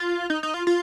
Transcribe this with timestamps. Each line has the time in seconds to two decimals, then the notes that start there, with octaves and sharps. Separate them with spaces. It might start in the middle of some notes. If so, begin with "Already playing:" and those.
Already playing: F4
0.30 D#4
0.43 D#4
0.54 F4
0.67 F4